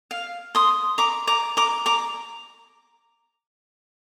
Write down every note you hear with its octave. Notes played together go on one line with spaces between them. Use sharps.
F5
C6 D#6
A#5 D6
A#5 D6
A#5 D6
A#5 D6